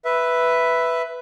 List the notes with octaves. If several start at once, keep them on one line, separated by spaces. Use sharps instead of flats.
B4 E5